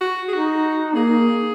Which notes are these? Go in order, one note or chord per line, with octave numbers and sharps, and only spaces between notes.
F#4
G#4
D#4 F#4
A#3 G#4